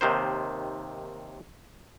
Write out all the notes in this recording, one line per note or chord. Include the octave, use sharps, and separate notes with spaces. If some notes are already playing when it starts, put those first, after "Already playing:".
D#2 C3 D#3 C5